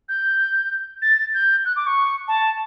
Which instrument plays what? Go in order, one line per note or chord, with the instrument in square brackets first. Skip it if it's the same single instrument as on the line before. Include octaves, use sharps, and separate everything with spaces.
[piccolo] G6
A6
G6
F#6
D6
C#6
A5